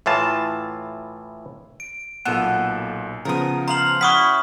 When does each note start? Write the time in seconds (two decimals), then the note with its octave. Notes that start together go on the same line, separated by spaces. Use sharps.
0.06 A2 E3 F4 A5
1.80 D7
2.25 B1 A#2 B3 A4 E7
3.25 C#3 F3 B3 A#4 D#6
3.68 C5 F5 A#5 F#7
4.01 C#4 E4 F#4 F#5 C#6 D#6 F#6 B6